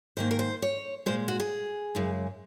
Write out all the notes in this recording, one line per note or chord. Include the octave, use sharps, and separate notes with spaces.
G#2 D#3 A#3 C5
A#4
C5
C#5
A#2 G#3 C5
F#4
G#4
F#2 C#3 G#3